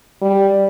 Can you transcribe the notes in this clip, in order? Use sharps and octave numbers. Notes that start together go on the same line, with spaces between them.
G3